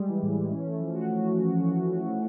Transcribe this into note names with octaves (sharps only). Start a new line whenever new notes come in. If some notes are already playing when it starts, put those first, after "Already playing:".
Already playing: G3 G#3
E3
A2
E3
C#4
A3
F3
F#4